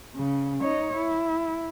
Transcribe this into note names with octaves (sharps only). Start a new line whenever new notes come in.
C#3
D#4 C#5
E4